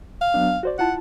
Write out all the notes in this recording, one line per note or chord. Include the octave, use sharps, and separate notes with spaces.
F5
F#3 B3 D4
F#4 C5 D5
E4 F4 F#5 A5